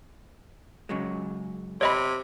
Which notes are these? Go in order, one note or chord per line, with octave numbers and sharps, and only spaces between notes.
C#3 F#3 G#3
C3 C#5 D#5 B5